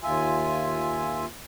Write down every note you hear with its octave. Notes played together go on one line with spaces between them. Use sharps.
D#2 F4 E5 G#5